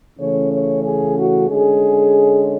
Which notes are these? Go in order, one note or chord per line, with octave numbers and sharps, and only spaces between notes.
C#3 E3 A3 C#4 C#5
C#5
G#4
F#4
D3 G#3 C#4 G#4